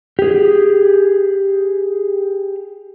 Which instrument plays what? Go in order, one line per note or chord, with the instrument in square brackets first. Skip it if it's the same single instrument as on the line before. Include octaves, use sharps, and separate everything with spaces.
[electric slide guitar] G4 G#4